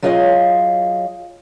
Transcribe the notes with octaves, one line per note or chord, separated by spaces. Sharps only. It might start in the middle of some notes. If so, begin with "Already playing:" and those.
F#3 F4 G#4 C#5 D#5 F5